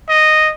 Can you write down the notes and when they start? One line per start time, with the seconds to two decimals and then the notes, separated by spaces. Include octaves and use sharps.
0.09 D#5